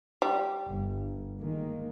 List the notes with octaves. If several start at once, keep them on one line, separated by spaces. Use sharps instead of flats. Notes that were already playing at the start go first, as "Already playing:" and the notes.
G3
G1
D#3 G#3 A#3